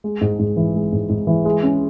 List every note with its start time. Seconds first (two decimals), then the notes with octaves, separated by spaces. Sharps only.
0.04 G#3
0.21 G#2
0.39 G#2
0.57 E3
0.75 G#3
0.93 G#2
1.09 G#2
1.27 E3
1.45 G#3
1.63 C#4